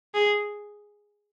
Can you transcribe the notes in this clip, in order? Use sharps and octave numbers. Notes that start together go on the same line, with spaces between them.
G#4